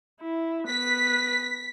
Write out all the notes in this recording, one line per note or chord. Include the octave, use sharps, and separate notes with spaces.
E4
B3 B4 B6